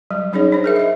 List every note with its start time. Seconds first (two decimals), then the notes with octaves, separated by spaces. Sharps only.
0.11 F#3 G3
0.33 F#3 C#4 D#4 G#4 C#5
0.52 D4 C5
0.64 G#4 A#4 E5
0.76 D#5 E5